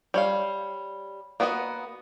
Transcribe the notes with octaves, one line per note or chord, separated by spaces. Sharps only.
G3 C#5 F5
A#3 B3 D4 F#4 D#5